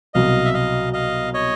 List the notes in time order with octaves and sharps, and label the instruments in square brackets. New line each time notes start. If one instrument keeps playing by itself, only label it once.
[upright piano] C2 B2 F#3 [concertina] D#5 F5
[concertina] E5
D#5 F5
D#5 F5
C#5 D#5